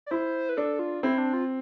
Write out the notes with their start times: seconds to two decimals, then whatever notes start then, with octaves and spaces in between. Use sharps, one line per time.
0.06 D5
0.11 E4 C5
0.49 B4
0.57 D4 A4
0.79 F4
1.03 C4 E4
1.18 D4
1.33 F4